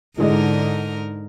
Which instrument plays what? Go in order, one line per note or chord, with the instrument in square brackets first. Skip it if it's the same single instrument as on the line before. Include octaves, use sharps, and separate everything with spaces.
[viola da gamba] G#2 D#4 A#4 [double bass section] D3 [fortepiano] E3 G#3 D#5